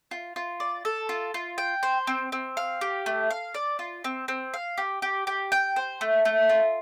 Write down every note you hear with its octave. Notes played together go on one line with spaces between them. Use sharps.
F4
F4
D5
A4
F4
F4
G5
C5
C4
C4
F5
G4
A3
F5
D5
F4
C4
C4
F5
G4
G4
G4
G5
C5
A3
A3
F4